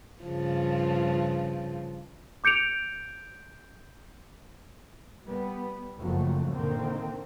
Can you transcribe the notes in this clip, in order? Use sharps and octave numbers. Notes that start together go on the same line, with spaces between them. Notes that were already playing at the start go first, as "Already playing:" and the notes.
G2 C#3 F3
D6 G6 C#7 D7 F7
G3 B3
F#1 F2 F3 F#3 A3
A#2 D3 D#3 A#3 C4